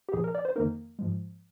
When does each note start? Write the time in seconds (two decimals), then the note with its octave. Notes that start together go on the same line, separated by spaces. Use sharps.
0.09 G4
0.13 C2 A#2 F3 G#4
0.24 A#4
0.35 D5
0.45 C5
0.56 F2 D#3 A#3 D#4 A#4
0.99 G#2 F3 G#3